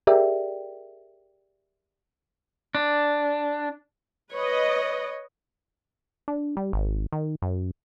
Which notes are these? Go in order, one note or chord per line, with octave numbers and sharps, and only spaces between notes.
G4 G#4 A#4 D5 E5 G5
D4
B4 C#5 D#5
D4
G3
G#1
D#3
F#2